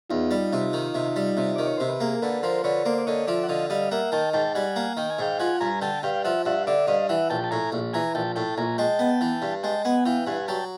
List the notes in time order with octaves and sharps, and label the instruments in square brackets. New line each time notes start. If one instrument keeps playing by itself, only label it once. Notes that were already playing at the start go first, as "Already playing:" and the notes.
[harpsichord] E2 [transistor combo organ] D#4 F4
[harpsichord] G3
C3
D#3
C3
G3
C3
[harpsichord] D#3 [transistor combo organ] D5
[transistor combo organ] C#5
[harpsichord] C3 [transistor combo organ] C5
[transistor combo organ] B4
[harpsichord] A#3 [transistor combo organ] G#4 A#4
[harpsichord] D3 [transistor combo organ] A4 B4
[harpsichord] F3 [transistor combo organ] A#4 C5
[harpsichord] D3 [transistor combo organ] B4 C#5
[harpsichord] A#3 [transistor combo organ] C5 D5
[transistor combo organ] D5
[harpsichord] D3 [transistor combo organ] C#5 D#5
[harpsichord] F3 [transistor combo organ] D5 E5
[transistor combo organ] F#5
[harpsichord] D3 [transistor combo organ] D#5 F5
[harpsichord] G3 [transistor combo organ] D#5 F5
[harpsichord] A#3 [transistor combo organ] E5 F#5
[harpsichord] D#3 [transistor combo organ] G5 A5
[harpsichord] G#2 [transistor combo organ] G5 A5
[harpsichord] G3 [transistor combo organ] F#5 G#5
[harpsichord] A#3
[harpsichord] D#3 [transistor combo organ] G5
[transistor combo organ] G#5
[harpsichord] G#2 [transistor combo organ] F5 G5
[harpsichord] F3 [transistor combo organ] F#5 G#5
[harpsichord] G2 [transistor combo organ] G#5 A#5
[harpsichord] D3 [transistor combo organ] G5 A5
[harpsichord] G2 [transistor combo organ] F5 G5
[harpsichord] F3 [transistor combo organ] E5 F#5
[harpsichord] G2 [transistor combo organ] E5 F#5
[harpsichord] D3 [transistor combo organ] D5 E5
[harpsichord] G2 [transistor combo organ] D#5 F5
[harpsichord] E3 [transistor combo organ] E5 F#5
[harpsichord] A#1 [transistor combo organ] G5 A5
[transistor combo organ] A5
[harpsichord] A2 [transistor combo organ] G#5 A#5
[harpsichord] A#1
[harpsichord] E3 [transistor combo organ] G#5 A#5
[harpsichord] A#1 [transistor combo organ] G5 A5
[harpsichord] A2 [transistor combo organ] G5 A5
[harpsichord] A#1 [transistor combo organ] G#5 A#5
[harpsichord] G#3 [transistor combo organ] G5 A5
[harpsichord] B3
E3
G2
[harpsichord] G#3 [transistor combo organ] G5 A5
[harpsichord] B3 [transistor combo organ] F#5 G#5
[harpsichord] E3 [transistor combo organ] F5 G5
[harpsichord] G2 [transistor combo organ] F#5 G#5
[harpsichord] F#3 [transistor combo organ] G5 A5